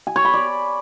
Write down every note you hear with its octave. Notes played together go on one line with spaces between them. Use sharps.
G#5
C#5
B5
D5